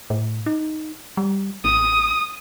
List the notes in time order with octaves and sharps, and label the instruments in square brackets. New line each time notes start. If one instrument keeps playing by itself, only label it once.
[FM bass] A2
D#4
G3
[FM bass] A1 [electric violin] D#6